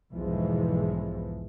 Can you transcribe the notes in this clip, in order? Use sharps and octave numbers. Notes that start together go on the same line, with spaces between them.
B1 E2 G#2 E3 F3 G#3